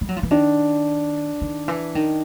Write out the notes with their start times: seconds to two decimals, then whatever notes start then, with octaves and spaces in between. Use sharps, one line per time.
0.01 G3
0.09 F#3
0.16 F3
0.23 E3
0.31 D#3 D4
1.41 D#3
1.68 E3
1.95 D#3